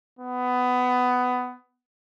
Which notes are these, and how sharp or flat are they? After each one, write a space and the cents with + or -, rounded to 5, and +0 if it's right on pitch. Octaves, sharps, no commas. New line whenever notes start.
B3 +15